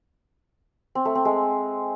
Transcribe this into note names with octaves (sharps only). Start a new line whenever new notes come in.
C4
A3
C4
G#3